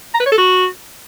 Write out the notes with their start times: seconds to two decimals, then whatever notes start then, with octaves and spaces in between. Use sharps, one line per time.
0.14 A#5
0.20 B4
0.26 C#5
0.32 A4
0.38 F#4